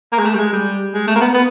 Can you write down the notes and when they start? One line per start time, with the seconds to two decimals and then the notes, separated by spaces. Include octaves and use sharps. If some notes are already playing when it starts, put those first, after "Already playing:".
0.12 A#3
0.19 G#3
0.25 A3
0.34 G3
0.39 G#3
0.53 G3
0.94 G#3
1.07 A3
1.16 A#3
1.21 B3
1.34 B3